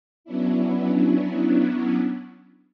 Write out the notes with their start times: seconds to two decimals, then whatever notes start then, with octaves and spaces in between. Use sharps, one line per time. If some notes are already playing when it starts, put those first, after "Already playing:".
0.24 F#3 B3 C#4 D4 E4